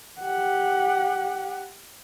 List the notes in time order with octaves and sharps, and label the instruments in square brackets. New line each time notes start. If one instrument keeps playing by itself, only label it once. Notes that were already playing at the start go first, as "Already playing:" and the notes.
[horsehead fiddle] G4 F#5